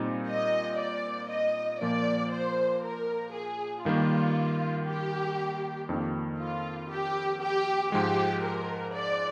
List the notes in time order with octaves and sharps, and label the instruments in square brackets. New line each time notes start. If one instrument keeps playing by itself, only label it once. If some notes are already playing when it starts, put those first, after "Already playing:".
Already playing: [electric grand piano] A#2 G3 C4 D#4
[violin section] D#5
D5
D#5
[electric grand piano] A#2 F3 A#3 [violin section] D5
[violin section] C5
A#4
G#4
[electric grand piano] G2 D#3 G3 A#3 [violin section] F4
[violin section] G4
[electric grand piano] F2 D#3 A#3 D4
[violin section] F4
G4
G4
[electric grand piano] G#2 F3 G#3 [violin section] G4
[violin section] A#4
D5